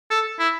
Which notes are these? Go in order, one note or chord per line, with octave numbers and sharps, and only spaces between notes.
A4
E4